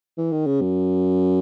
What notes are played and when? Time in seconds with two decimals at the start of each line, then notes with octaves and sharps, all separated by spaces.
0.18 E3
0.32 D#3
0.47 C#3
0.61 F#2